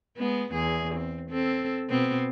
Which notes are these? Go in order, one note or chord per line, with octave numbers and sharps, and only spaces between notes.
G#3 B3
E2 G#4
C4
C4 A4
B2 B3 C4